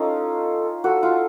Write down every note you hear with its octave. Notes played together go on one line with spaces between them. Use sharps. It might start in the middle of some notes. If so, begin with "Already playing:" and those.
Already playing: C#4 D#4 F4 A4
F#4 A4
F4